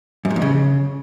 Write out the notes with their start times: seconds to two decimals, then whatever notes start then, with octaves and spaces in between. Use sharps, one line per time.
0.25 F#2
0.30 G#2
0.36 F2
0.42 C#3